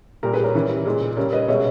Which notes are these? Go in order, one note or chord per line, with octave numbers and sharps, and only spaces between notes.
A#2 G3 G4 A#4
G#4 B4
A#4 C#5
C#3 E3 G3
A#2 G#3
C#3 G3 A#4 C#5
B4 D#5
B2 G#3 C#5 E5